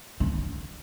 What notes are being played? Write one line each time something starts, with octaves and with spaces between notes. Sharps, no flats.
D3